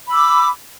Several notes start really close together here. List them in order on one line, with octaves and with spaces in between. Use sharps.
B5 E6 D6